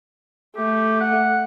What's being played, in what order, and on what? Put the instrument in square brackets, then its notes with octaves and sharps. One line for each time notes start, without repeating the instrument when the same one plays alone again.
[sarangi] A3 [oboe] G4
[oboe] F#5